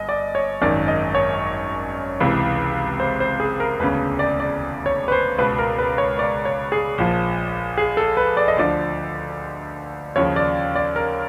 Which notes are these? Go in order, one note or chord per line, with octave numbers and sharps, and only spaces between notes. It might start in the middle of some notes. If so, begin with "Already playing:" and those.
Already playing: G1 D#5
D5
C#5
G#1 F#2 D#3 D5
D#5
C#5
C#2 C3 E3
C5
C5
G#4
A#4
E1 D2 C#3 B4
D5
D5
C#5
B4
C5
C#2 B2 B4
A#4
B4
C#5
D5
C#5
G#4
A#1 A#2 F3
G#4
A4
B4
D5
D#5
D2 D3 F3 D5
D#2 C#3 F3 C#5
D5
D5
A#4